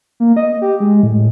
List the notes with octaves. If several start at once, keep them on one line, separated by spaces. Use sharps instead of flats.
A#3
D#5
G4
G#3
A2